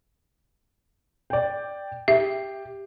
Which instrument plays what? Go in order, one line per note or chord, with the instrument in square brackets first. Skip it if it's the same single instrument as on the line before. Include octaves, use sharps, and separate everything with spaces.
[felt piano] D5 G5
[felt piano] G4 [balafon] E5